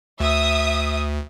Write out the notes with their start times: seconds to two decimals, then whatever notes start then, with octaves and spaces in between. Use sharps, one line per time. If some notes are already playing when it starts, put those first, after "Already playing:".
0.20 D2 E5 D#6